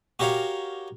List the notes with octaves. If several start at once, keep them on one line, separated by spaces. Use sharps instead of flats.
F#4 G4 A#4 C#5 F5